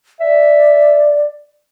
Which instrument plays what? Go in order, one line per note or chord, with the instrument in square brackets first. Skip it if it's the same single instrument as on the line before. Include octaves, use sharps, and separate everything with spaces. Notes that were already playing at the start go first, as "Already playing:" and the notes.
[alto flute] D5 [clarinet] E5